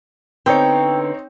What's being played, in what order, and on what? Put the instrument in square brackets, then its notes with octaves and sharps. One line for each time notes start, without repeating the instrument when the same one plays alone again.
[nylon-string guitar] D3 B3 [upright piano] C4 D#4 C#5 [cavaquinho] G5